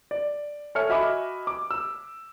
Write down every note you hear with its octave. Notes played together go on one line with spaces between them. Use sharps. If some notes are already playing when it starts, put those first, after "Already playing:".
D5
A4 C#5 E5 G#5 F6 C#7
F#4 D#5 E5 G#5 B5 D6
D6
E6